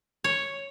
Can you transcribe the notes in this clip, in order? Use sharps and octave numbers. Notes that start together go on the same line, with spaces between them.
C#5